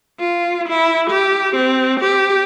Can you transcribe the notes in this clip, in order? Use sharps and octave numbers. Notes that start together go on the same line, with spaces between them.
F4
E4
G4
C4
G4